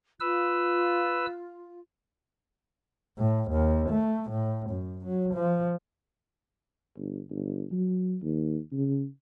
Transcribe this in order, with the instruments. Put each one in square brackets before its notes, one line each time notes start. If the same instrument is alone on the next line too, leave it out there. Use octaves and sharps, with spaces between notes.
[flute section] F4 [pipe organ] B4 E6
[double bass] A2
D#2
A3
A2
F#2
F#3
F3
[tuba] G1
G1
F#3
D#2
C#3